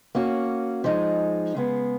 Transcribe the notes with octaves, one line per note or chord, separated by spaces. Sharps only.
A#3 C#4 F#4
F3 G#3 D#4
C#3 G#3 B3